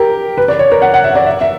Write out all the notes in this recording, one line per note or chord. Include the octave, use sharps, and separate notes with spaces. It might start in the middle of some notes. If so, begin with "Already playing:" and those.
Already playing: G4 A#4
B4
D5
C#5
A#4
F#5
F#5
E5
D5
E5
E5